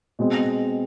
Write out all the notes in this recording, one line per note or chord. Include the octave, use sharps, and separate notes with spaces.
B2 G#3 C4